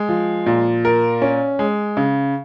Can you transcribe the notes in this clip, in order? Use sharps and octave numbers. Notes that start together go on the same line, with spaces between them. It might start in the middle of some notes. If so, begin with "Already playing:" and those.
Already playing: G#3
F3
A#2
A#4
C#4
G#3
C#3